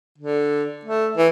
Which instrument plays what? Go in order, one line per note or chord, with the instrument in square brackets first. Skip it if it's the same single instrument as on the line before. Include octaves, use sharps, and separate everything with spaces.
[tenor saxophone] D3
A3
E3